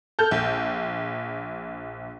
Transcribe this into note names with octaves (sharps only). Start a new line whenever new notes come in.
A4 F6 G6
A#1